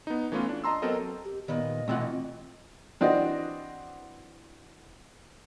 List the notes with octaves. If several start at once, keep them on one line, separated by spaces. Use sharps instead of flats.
B3 D#4
E3 A3 B3 C#4 F4
D4
D#5 A5 A#5 C6 E6
F#3 B3 C4 A4 A#4 D#5
G4
A#2 D#3 B3 D#5
D2 B2 E3 A3 C4 F4 F#5
E3 C4 D4 F#4 D5 D#5